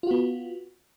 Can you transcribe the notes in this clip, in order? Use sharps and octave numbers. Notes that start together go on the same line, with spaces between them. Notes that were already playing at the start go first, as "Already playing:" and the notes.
B3 F4 F#4